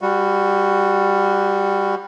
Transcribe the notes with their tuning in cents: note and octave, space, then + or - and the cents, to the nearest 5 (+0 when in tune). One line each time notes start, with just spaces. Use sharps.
G3 +15 F#4 -10